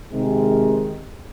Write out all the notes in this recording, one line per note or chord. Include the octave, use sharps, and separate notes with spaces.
C3 D#3 G#3